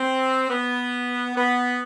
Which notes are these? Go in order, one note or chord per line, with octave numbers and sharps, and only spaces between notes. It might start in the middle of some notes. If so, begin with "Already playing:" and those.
Already playing: C4
B3
B3